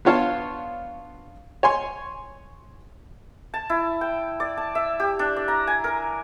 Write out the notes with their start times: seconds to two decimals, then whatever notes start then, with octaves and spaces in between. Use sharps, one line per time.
0.05 B3 D4 F4 C#5 F5 A5
1.63 C#5 G#5 C6
3.54 A5
3.70 E4
4.01 G5
4.40 D5
4.57 A5
4.75 E5
5.00 G4
5.19 D4
5.36 D5
5.48 A#5
5.67 G#5
5.84 A#4